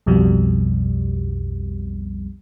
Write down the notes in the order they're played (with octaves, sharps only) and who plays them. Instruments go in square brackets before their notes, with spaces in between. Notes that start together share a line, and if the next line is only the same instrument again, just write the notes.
[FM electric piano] B1 F2 B2 G3